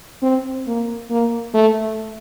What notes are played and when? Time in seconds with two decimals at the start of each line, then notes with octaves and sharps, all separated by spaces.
0.23 C4
0.67 A#3
1.10 A#3
1.54 A3